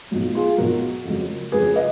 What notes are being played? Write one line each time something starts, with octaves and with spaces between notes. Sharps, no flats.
B1 B2 F#3 F4
F4 G#4
B1 B2 F#3 F#4 A#4
F2 C#3 F#3
F2 C#3 F#3 G#4 B4
B4 D#5